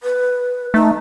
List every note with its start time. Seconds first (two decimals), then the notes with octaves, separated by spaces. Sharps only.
0.03 B4
0.74 A3 D#4